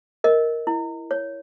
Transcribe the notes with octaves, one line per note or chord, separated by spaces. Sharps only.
A#4 D#5
E4
C#5